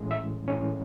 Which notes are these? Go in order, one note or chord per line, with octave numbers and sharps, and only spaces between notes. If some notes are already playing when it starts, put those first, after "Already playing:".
Already playing: A2 E3 G#3 C#4
E5
A2 E3 G#3 C#4